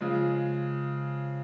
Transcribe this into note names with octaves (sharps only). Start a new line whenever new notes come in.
C#3 F3 G#3